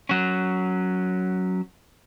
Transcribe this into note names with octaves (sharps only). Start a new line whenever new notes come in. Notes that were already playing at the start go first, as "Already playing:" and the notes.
F#3 C#4